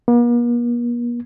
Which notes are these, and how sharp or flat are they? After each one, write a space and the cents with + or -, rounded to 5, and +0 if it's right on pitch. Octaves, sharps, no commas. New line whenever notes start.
A#3 +45